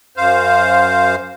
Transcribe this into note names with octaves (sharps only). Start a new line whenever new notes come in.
F#2 C5 F5